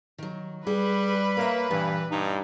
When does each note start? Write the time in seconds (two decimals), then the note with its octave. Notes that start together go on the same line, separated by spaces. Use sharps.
0.18 D#3 F#3
0.67 G3 G#4 B4
1.37 A#3 A#4 C#5 E5
1.71 G2 A#2 E3
2.11 G2 D#4